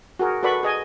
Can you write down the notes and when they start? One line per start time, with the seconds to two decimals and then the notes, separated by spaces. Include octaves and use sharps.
0.19 F#4 G#4 A#4
0.43 F#4 A4 B4 D5 B5 C#6
0.63 G#4 D#5 G#5